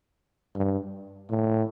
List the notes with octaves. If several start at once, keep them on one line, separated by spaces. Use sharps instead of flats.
G2
A2